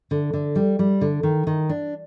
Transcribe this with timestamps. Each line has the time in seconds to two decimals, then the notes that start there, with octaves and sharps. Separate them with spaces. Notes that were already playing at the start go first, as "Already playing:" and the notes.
0.11 D3
0.34 D3
0.56 G3
0.79 G3
1.01 D3
1.23 D#3
1.47 D#3
1.69 D4